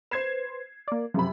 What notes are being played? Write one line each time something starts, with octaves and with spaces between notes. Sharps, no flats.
B4 C5 G#6 C7 E7
A#3 D5
F#2 C3 F3 B5